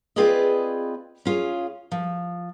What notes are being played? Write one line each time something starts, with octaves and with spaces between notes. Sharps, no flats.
C4 F4 G#4 B4 D5 D#5
C#4 F4 G#4
F3